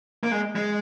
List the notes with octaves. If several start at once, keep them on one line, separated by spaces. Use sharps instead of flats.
A#3
G#3
G#3